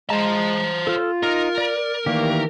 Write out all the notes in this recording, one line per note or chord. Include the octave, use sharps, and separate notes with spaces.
G#3 C5 A5 A#5
F4 A4 F6
D#4 A#4
D5
D#3 E3 G3 A3 A#3 G4